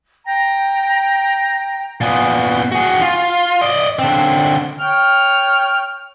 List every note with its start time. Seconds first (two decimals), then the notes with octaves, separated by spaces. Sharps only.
0.25 G5 A#5
2.01 A#2 B3
2.72 F#4 G#4
3.02 F4
3.61 D5 D#5
3.99 D3 C4
4.80 C#5 G5 F6